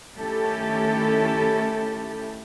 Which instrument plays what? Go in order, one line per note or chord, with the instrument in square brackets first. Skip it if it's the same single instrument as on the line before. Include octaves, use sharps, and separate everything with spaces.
[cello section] D#3 A3 C#4 E4 G4 A4